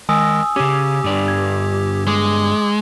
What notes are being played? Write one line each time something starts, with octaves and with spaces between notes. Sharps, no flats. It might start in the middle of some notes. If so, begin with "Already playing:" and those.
D#3 G#3 G#5 D#6 E6 A#6
C#3 C#4 G4 D6
G2 D3 D5
G#6
G#3 D6 D#6